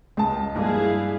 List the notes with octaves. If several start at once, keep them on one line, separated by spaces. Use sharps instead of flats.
C#2 G#3 A5
G2 F3 A#3 E4 G#4 F5